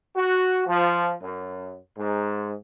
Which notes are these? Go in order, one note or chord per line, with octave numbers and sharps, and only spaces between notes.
F#4
F3
F#2
G#2